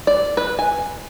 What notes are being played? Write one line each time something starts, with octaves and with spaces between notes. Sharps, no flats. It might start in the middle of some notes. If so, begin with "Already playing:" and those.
D5
B4
G#5